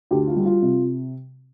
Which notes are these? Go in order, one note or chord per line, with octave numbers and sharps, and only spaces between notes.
D2 G4
F4
G3
F4
C3